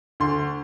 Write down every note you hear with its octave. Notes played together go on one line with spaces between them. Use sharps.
D2 C6